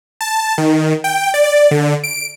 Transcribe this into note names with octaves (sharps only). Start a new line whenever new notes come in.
A5
D#3
G5
D5
D3
D7